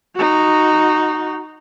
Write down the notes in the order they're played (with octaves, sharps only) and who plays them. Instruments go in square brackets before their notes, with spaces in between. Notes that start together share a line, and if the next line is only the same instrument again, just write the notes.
[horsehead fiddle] D#4 F#4